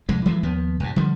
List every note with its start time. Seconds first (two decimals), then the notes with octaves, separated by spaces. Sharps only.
0.09 C2 F2 G#3
0.26 E3 F#3 G#3 A3
0.43 D#2 F3 B3
0.80 C2 G2
0.96 D3 F3 G3